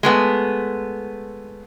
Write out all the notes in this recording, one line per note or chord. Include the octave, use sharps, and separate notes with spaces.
G#3 A3 B3